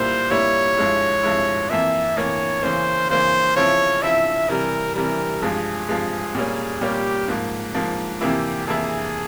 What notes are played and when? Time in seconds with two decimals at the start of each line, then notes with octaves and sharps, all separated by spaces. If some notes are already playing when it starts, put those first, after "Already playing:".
Already playing: A#2 G3 A#3 E4 C5
0.30 A#2 G3 A#3 E4 C#5
0.77 G2 F3 G#3 E4
1.23 G2 F3 G#3 E4
1.70 F2 E3 A#3 E5
2.17 F2 E3 A#3 C#5
2.63 C#3 E3 A#3 C#4 C5
3.10 C#3 E3 A#3 C#4 C5
3.56 C#3 F3 C4 E4 C#5
4.02 C#3 F3 C4 E4 E5
4.49 C3 E3 G3 A#4
4.95 C3 E3 G3 A#4
5.42 G2 F3 G#3 G#4
5.89 G2 F3 G#3
6.35 A#2 G3 A#3 C#4
6.81 A#2 G3 A#3 C#4 G4
7.28 G#2 F3 A#3
7.75 G#2 F3 A#3
8.21 F2 C3 E3 A#3 E4 G4
8.67 F2 C3 E3 A#3 E4 G#4